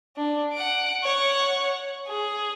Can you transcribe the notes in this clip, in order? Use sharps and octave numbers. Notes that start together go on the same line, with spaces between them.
D4
F#5 D7
C#5 F#5
G#4